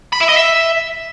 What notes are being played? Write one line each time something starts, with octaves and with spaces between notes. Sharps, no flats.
B5
E5
D#5
E5